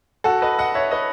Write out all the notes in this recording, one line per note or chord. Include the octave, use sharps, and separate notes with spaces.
F#4 A4
B4 D#5
D#5 F#5
C#5 E5
B4 D#5